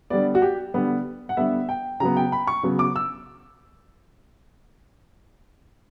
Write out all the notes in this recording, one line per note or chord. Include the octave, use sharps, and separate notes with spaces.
D3 G3 B3 D5
F#4
G4
D3 G3 B3
F#5
D3 G3 B3 E5
G5
C#3 F#3 B3 A#5
G5
B5
C#6
C#3 F#3 B3
D6
E6